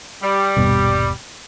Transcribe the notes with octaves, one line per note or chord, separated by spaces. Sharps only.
G3
D#1 G2 B2